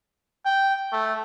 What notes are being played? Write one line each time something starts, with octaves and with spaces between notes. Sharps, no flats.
G5
A3